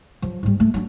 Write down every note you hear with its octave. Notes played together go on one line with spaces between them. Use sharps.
F3 F#3
G#2 G3
A3
F#3 D4